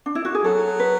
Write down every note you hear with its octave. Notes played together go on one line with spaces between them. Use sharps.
D4
E4
F#4
G#4
F#3 A4
B4